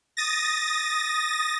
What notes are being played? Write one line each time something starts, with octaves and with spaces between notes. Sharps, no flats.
D#6 A6 A#6